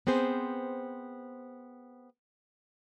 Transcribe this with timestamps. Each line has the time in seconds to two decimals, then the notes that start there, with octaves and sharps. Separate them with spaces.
0.07 B3 C4 G#4 C5